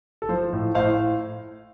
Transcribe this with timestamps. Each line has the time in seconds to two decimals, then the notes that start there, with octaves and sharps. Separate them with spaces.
0.22 A4
0.29 F3 C5
0.53 A2
0.75 A2 C5 F5